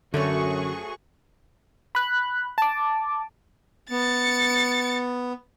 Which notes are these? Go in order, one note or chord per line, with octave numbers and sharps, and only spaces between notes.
F#2 D3 A3 C4 F#4 G#4 C#5 C#6
B5 F#6
A5 D6
B3 A6 C#7